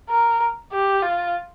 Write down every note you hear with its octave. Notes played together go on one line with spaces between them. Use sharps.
A#4
G4
F4